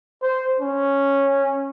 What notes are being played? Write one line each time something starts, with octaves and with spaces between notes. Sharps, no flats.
C5
C#4